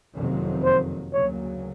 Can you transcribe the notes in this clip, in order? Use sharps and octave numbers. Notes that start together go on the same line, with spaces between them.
F#1 F2 C3 D#3 F#3
C5
D2 C#3 F#3 A#3 C#5